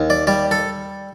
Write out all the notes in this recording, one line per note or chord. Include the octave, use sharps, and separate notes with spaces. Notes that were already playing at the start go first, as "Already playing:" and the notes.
Already playing: D#2
D5
G3 D5
A4